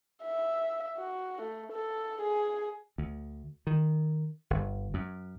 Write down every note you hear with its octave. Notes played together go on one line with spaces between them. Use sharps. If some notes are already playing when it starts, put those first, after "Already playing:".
E5
F#4
A3
A4
G#4
D2
D#3
G1
F#2